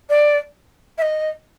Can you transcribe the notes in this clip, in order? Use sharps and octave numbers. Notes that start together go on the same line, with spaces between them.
D5
E5
D#5